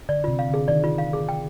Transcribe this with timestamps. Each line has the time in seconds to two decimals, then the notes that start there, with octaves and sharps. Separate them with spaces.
0.09 D3 D5
0.24 C3 F4
0.39 F5
0.49 D3 G#4
0.68 D#3 D5
0.84 F4
0.98 F5
1.13 G#4
1.29 G5